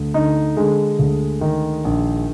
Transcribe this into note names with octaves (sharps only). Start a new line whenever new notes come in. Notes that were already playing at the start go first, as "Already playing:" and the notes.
Already playing: D2
D3 D#4
D3 G#3
D2
D#3
A#1